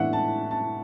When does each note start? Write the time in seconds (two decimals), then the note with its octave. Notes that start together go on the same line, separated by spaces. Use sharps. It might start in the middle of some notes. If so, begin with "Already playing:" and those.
Already playing: A2 E3 B3 D4 E5 F#5
0.13 A5
0.51 A5